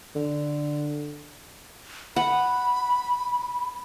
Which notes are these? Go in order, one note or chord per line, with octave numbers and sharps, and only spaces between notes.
D3
F#5 B5